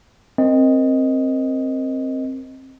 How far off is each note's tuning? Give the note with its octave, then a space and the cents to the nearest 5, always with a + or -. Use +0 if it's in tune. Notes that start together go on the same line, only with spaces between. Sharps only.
C4 +15 A#4 +0 D#5 +0